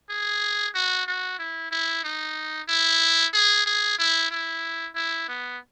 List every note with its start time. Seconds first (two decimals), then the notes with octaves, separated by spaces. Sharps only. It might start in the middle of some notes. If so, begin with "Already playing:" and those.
0.10 G#4
0.75 F#4
1.07 F#4
1.39 E4
1.72 E4
2.04 D#4
2.69 E4
3.33 G#4
3.66 G#4
3.99 E4
4.31 E4
4.95 E4
5.29 B3